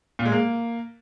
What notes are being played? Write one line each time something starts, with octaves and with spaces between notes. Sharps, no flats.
A#2
G#3
A#3